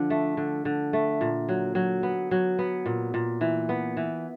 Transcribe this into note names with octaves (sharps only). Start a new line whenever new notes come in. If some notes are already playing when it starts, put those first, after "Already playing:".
Already playing: D3 F3
A3
D3
D3
A3
A#2
F#3
F#3
B3
F#3
B3
A#2
A#2
E3
B3
E3